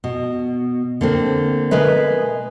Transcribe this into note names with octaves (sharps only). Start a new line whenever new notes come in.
B2
D3 A#3 C4
B2 G#3 A#4 B4 E5